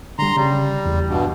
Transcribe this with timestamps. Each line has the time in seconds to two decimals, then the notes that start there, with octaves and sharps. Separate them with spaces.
0.19 D3 G3 A#5 C6
0.37 C#3 G3
0.86 E2
1.08 G2 B2